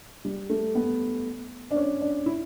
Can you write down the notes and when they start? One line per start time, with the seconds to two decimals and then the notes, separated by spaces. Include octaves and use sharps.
0.25 G3
0.50 A3
0.75 B3
1.71 D4
1.76 C#4
2.01 D4
2.26 E4